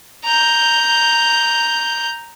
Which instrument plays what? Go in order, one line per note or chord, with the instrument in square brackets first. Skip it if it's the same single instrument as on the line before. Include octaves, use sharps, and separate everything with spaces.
[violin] A#5 G6